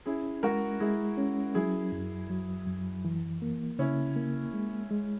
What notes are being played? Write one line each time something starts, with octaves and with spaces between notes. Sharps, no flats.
C#4 E4 G#4
G#3 F#4 A#4
G#3 E4 G#4
C#4
F#3 E4 G#4
F#2
F#3
F#2
E3
A#3
C#3 C#4 E4
A#3
G#3
G#3